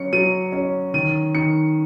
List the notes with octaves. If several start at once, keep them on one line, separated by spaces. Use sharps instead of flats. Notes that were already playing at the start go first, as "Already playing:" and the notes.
Already playing: F#3 C#4 C#7
F#3 D#7
C#4
D#3 D#7
D#3 C#7